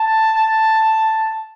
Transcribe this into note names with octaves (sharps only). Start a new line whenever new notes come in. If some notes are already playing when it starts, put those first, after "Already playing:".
Already playing: A5